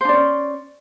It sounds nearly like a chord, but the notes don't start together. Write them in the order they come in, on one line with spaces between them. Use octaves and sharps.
C5 D4 D5 C#4